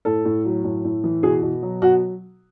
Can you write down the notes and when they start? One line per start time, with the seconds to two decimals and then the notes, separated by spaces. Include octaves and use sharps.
0.05 A2 A4
0.25 A2
0.45 F#3
0.64 A2
0.84 A2
1.04 E3
1.23 B2 G#4
1.42 B2
1.62 F#3
1.82 B2 F#4